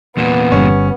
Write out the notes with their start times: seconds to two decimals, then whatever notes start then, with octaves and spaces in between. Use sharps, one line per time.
0.17 E2 A#2 B3
0.52 G1 G3 C#4